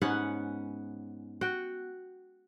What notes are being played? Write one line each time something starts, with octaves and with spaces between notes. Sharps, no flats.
G#2 B3 C#4 F#5
F#4 G5